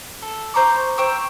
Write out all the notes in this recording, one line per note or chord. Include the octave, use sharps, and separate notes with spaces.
A4
C5 A#5 C#6 D6
C5 G5 C#6 E6